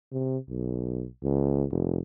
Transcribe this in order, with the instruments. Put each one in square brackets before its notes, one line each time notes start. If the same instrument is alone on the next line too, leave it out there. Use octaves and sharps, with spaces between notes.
[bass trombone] C3
B1
C#2
F1